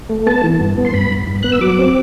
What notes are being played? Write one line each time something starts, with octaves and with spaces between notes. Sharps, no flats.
A3
B3 A5
E3
G2
B3
C6
G2 B5
G2
G2
B3 F#6
E6
F#3 D6
C4